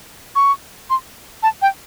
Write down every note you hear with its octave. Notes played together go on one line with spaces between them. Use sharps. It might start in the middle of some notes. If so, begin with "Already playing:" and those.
C#6
C6
A5
G5